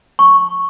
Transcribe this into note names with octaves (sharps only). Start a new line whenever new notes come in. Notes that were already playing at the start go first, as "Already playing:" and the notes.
C#6